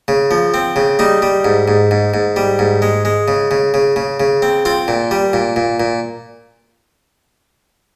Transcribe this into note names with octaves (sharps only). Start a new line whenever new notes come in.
C#3
F3
C4
C#3
G3 D#4
G3
G#2
G#2
G#2
G#2
G3
G#2
G#3
G#3
C#3
C#3
C#3
C#3
C#3
C4
C4 F4
A#2
G3
A#2
A#2
A#2